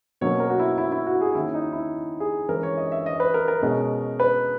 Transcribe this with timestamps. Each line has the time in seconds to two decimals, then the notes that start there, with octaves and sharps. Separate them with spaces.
0.21 B2 F#3 A#3 C#4 C#5
0.40 A#4
0.50 F#4
0.59 E4
0.78 E4
0.92 E4
1.07 F#4
1.21 G#4
1.35 D#3 A#3 C#4 E4
1.54 D#4
1.72 E4
2.20 G#4
2.49 E3 G#3 C#4 A#4
2.63 C#5
2.77 D#5
2.92 E5
3.06 D#5
3.20 B4
3.34 A#4
3.48 A#4
3.62 B2 G#3 C#4
4.20 B4